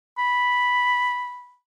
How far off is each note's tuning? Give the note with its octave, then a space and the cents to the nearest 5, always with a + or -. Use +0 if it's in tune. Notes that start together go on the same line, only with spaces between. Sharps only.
B5 -5